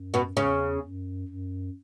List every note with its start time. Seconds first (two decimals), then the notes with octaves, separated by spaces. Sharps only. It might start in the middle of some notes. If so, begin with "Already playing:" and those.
Already playing: F#2
0.14 B2 B3
0.36 E2 C#3 C#4
0.83 F#2
1.28 F#2